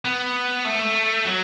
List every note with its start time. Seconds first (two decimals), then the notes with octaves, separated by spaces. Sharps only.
0.05 B3
0.65 A3
1.25 F#3